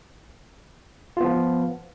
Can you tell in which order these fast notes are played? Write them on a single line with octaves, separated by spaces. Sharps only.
F4 B3 F3